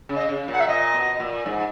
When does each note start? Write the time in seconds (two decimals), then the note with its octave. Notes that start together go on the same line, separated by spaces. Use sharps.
0.09 C#3
0.15 D#5
0.29 C#3
0.48 A#2 F#5
0.60 E5
0.67 A#2 D#5
0.94 B2
1.19 A#2
1.46 G#2